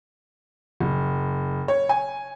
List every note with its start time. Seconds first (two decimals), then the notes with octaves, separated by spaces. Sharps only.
0.80 F#1
1.68 C#5
1.89 G#5